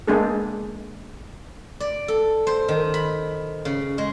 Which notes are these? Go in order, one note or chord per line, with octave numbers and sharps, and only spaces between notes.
G#3 A#3 B3 D4 G#4 A4
D5
A4
C5
D#3
B5
C#3
G#3